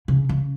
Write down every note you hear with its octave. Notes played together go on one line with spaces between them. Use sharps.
C#3
C#3